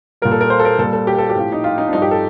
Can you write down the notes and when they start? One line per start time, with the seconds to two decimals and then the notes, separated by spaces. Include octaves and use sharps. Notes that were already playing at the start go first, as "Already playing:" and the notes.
0.22 A#2 G3 A#4
0.31 A4
0.41 A#4
0.50 C5
0.60 A4
0.65 A#4
0.79 A#2 G3 A4
0.93 A4
1.07 G4
1.18 A4
1.29 G4
1.35 A2 F3
1.52 D#4
1.64 F4
1.78 D#4
1.88 D4
1.93 G2 F3 D#4
2.02 G4
2.11 A4